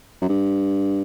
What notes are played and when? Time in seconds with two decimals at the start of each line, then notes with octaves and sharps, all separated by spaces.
0.21 F#2
0.28 G2